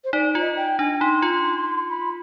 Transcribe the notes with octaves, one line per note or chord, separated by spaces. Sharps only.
C5
D#4 D5
F4
D#5
G5
D4 G#5
D#4 C6
F4
B5